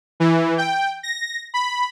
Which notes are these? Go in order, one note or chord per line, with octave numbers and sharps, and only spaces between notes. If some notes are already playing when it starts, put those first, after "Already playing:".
E3
G5
A#6
B5